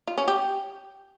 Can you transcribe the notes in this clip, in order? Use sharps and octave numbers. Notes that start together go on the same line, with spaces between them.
F4
C#4
G4